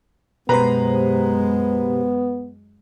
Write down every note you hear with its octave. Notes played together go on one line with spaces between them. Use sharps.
F#2 B2 G#3 B3 G4 B4 C5 A#5